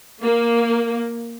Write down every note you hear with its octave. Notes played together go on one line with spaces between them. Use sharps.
A#3